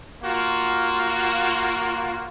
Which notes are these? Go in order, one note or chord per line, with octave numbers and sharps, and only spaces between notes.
A#3 F4 F#4